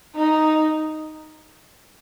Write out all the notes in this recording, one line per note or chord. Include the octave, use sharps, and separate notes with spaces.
D#4